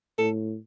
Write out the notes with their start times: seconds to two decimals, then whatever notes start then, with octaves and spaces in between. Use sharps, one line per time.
0.18 A2 A4